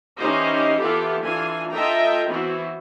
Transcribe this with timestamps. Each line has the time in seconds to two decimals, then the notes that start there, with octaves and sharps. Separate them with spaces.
0.17 E3 C#4 D#4 G4 C5 D#5
0.79 E3 B3 F4 G4 A4 E5
1.22 E3 D4 F4 G#5
1.71 F4 A4 D#5 E5 G5 A#5
2.27 E3 B3 C4 E4 F#4